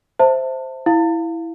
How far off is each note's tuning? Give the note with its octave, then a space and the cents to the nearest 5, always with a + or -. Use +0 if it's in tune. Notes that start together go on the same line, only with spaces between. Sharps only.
C5 +0 E5 +0 A5 +25
E4 +0 F5 +0